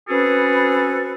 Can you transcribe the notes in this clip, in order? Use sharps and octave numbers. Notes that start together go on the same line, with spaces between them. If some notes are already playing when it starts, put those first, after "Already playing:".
C4 C#4 F#4 G#4 A4 B4